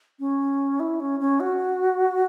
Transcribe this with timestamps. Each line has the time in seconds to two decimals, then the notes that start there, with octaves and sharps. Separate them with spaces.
0.20 C#4
0.80 E4
1.00 C#4
1.20 C#4
1.40 F#4